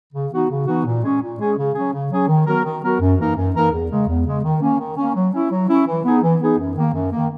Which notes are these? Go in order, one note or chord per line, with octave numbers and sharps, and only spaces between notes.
C#3
E3 B3 D#4 F#4
C#3
E3 B3 D#4 F#4
A#2
G#3 C#4 G#4
A#2
G#3 C#4 G#4
C#3
F#3 C#4 G#4
C#3
F#3 C#4 G#4
D#3
F#3 B3 F#4 A#4
D#3
F#3 B3 F#4 A#4
F#2
E3 A#3 D#4 A#4
F#2
E3 A#3 D#4 A#4
E2
C#3 G#3
E2
C#3 G#3
D#3
A#3 C#4
D#3
A#3 C#4
F#3
C#4 E4
F#3
C#4 E4
E3
B3 D#4 G#4
E3
B3 D#4 G#4
F#2
D#3 A#3
F#2
D#3 A#3